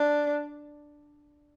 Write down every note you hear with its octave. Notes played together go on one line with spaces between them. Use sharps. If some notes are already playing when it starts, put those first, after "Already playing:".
Already playing: D4